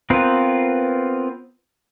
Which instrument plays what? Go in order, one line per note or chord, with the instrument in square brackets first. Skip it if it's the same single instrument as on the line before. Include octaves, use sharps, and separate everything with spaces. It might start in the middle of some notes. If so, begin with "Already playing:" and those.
[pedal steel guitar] B3 C4 F4 A#4 B4